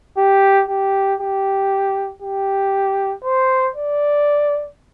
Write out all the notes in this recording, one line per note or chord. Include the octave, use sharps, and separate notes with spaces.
G4
G4
G4
G4
C5
D5